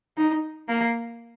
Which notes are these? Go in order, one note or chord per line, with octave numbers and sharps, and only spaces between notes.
D#4
A#3